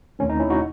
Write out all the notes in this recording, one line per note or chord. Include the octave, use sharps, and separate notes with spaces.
D#2 D#3 A3 C4 C#4
D#4
C#4 E4
D#4 F#4